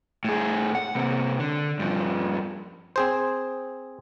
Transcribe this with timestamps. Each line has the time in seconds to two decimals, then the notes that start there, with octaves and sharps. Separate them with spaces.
0.24 A2 G#4
0.75 F#5
0.95 C3 A#3
1.40 D3
1.79 G2 F3
2.96 C4 G#4 C5